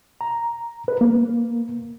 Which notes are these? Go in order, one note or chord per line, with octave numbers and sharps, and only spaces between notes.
A#5
B4
A#3